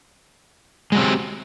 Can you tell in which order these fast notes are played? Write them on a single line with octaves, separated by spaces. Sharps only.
G#3 F#3 C4 G4